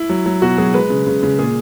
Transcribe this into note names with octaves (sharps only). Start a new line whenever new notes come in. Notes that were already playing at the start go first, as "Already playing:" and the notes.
Already playing: E4
F#3
F#3
B2 F#4
F#3 G#4
G#3 B4
C#3
C#3
C#3
A#2 G#4